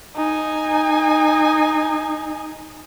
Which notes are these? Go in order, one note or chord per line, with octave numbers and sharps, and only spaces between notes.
D#4 G#5